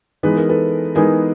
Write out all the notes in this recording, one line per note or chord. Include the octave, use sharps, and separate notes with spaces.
E3 G#3 B3 D#4 B4
A#4
A4 B4
E3 G#3 B3 D#4 G#4 A#4